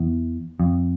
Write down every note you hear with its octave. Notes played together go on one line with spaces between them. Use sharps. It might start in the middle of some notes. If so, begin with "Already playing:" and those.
Already playing: E2
F2